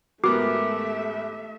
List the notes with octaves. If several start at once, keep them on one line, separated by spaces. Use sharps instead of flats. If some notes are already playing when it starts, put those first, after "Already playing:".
G#2 A3 B3 F#4 G4 A#4 E5 D6